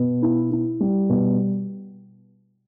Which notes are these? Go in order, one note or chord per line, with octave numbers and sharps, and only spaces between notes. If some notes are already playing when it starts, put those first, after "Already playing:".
Already playing: B2 B3
E4
E4
G3
B2